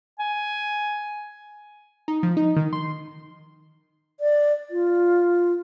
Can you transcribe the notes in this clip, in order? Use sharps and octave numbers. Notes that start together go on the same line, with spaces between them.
G#5
D#4
F3
D#4
D#3
C6
D5
F4